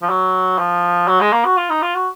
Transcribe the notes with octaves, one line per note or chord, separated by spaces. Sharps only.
F3
F#3
F3
F#3
G#3
A#3
F#4
F4
D#4
F4
F#4